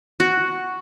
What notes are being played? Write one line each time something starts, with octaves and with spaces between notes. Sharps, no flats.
F#4